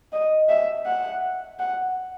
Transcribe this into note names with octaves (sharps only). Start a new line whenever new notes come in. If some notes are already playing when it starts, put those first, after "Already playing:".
D#5
E5
F#5
F#5